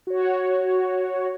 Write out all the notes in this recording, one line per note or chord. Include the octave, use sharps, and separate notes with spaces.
F#4 C#5